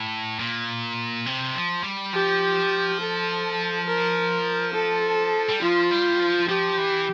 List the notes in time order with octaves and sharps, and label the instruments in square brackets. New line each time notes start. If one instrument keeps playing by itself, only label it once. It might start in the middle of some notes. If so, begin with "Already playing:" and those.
Already playing: [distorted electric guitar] A2
A#2
C3
F3
G3
[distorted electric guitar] F3 [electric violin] G4
[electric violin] A4
A#4
A4
[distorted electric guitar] G3
[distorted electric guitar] F3 [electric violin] F4
[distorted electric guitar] G3
F3
[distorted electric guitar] F3 [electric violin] G4
[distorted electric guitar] E3